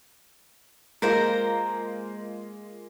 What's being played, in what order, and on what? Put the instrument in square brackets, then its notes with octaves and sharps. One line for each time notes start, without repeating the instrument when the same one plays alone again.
[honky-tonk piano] G#3 A#3 F4 [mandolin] A#4 C5 A#5